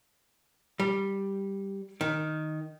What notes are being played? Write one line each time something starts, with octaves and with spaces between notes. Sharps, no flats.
G3
D#3